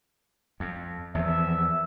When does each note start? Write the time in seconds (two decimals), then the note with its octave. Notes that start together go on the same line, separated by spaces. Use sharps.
0.60 F2
1.15 E2 F3 E5